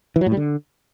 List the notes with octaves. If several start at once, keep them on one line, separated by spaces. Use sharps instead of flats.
E3
F#3
A2
G3
D3